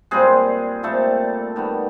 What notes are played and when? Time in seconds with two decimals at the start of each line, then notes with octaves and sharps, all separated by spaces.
0.11 A#2 G3 G#3 C4 G#4
0.83 A#2 G3 A3 C4 A4
1.56 D#3 G3 B3